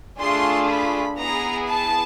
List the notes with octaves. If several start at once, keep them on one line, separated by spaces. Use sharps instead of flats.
A3 D4 F4 G#4 C6
B5
B3 E4 G#4 A#5
A5